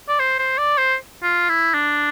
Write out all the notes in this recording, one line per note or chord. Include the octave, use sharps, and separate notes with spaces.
D5
C5
C5
D5
C5
F4
E4
D4